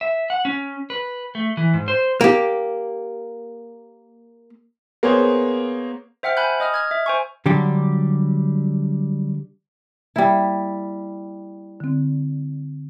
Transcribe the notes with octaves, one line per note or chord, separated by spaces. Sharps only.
E5
F#5
C#4
B4
A3
E3
G#2
C5
A#3 G4
A#3 B3 G#4 C5 C#5
C5 E5 F#5 G5 F6
G#5 B5 F#6 G6
D#5 D#6 F6
F6 G#6
E5
C5 G#5 C#6
D3 F#3 G3 D4 G4
G3 A#3 E4
D3 C4